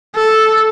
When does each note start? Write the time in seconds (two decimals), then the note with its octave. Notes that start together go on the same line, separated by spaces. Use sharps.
0.15 A4